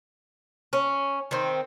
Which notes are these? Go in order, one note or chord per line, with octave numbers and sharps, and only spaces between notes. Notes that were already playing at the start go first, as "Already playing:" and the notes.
C#4
D#3 C4